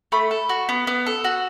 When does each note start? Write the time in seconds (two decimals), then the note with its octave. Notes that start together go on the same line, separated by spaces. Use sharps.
0.12 A3 B5
0.31 A4
0.49 F#4
0.69 B3
0.87 B3
1.06 A4
1.24 F#4